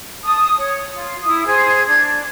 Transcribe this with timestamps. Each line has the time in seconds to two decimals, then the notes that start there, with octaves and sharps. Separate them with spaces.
0.24 A5 D#6
0.56 C#5
0.93 F4
1.25 E4 D#6
1.46 G#4 C5 G#6
1.87 D4 G#6